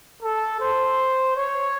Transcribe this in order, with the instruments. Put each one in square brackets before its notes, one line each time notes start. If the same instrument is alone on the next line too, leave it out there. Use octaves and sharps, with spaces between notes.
[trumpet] A4
C5
C#5